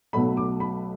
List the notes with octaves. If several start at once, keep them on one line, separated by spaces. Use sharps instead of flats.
B1 B2 F#3 A3 B5
D6
B5